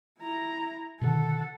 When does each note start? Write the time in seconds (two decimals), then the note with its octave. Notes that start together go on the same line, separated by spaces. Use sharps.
0.19 E4 A#5
1.01 B2 D3 D#3 A4 F#5